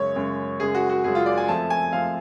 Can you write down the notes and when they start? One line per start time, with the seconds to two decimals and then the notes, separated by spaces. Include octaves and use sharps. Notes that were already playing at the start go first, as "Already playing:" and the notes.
Already playing: F#2 C#3 G#3 C#5
0.16 F#2 C#3 G#3
0.60 F#2 C#3 G#3 G#4
0.75 F#4
0.90 F#4
1.04 F#2 C#3 G#3 G#4
1.15 F4
1.26 D5
1.37 G#5
1.48 F2 F3 A3 A5
1.70 G#5
1.93 F2 F3 A3 F5